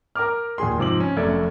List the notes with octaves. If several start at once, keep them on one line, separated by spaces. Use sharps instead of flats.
A#4 A#5 D6 F6
D#2 A#2 G#4 C6
G#2 C3 F3 D6 F#7
C#4
F1 F#2 A3 A4 D5 G#6